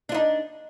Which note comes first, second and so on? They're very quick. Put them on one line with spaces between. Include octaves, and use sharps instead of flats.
D4 F4 D#4